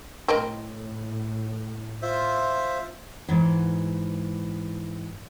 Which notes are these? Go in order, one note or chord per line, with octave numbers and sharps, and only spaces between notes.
A2 C4 A#4 D#5
F4 C5 E5
G#2 E3